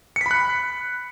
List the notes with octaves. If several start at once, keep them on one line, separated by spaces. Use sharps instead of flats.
B5 F#6 B6 C#7